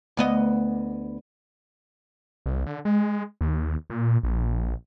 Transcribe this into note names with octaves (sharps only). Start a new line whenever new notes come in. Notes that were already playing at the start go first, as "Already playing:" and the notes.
D2 B3 D#5
C2
D3
G#3
D#2
A#2
A#1